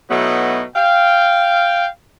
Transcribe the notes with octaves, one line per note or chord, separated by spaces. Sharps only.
B2 F#3 A3 B3 D#4 E4
F5 G5